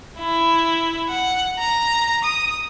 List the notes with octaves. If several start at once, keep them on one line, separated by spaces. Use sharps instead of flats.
E4
F#5
A#5
D#6